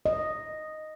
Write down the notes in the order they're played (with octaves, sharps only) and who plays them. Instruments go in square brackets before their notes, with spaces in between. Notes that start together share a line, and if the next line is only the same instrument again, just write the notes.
[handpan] D#5